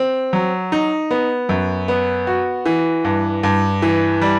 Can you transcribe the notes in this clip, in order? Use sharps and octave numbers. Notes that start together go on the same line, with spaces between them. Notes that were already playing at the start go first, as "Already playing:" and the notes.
Already playing: C4
F#3
D#4
B3
F#2
B3
F#4
E3
G2
G2
E3
G3